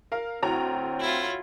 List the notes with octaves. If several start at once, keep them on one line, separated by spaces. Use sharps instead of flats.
A#4 F5
D2 A2 C4 F#4 C#5 G5 A#5
E4 F4